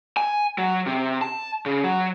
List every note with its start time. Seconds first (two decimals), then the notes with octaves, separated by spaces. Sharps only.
0.17 G#5
0.58 F#3
0.86 C3
1.21 A5
1.66 C#3
1.84 F#3